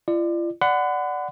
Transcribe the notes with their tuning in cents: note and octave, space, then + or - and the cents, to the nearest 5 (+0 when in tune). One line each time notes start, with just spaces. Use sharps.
F4 -45 D5 +30
D5 +0 F#5 +0 B5 +40